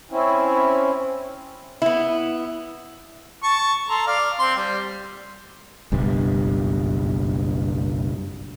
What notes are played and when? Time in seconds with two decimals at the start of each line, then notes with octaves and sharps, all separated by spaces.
0.11 C4 C#4 E4
1.82 B3 E4
3.43 A5 C#6
3.89 A4 A#5 C6
4.07 D5 F5
4.39 C4 C6
4.56 G3
5.92 F#1 B1 G2